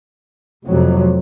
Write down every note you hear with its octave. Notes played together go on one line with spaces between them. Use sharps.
F1 F2 C3 F#3